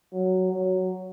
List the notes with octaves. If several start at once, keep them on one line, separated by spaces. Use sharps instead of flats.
F#3
F#3